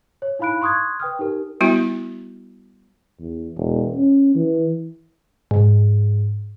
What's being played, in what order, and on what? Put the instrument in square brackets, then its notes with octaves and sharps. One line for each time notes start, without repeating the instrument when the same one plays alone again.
[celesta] C#5
D#4 E4 F5 B5 F#6 D7
C6 C#6 D#6 F#6 G#6
B4 G5 D#6 F6
D#4 G4 A#4
[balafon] G3 B3 E4 F#4
[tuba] E2
E1
C#4
E3
[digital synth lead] G#2